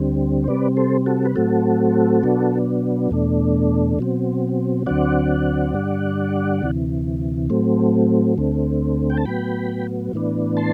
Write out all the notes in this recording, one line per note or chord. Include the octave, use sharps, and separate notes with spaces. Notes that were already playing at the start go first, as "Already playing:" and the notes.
Already playing: D2 D3 G3 C4
C5
C3 G3 C4 B4 D5
A4 C5
F#4 A4
B4
A2 F#3 A3 C4 F#4 A4
B2 F#3 B3 D4
E2 B2 A3 D4
B2 F#3 C4
D2 D3 F#3 C4 D5 F#5
G2 D3 G3
D2 C3 E3
A2 F#3 A3 C4
D2 D3 A3 C4
G5
A5
A2 F#3 B3 G5 B5
A2 E3 B3 D4
A5 C6